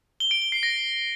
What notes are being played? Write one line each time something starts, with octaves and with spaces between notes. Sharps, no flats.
G7
D7
G7
C7
A#6